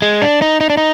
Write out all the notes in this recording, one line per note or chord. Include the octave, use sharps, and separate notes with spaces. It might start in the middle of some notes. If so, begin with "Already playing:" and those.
G#3
D4
D#4
D#4
D4
D#4